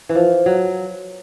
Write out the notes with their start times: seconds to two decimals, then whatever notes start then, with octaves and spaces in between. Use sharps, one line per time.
0.09 E3
0.15 F3
0.46 F#3